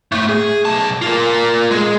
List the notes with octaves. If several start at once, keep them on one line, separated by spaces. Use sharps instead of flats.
A2 A3
G#4
B1 A5
F4 A#4
G#3 G#4